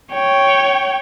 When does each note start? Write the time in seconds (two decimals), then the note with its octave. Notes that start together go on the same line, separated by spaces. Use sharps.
0.12 C#5 G5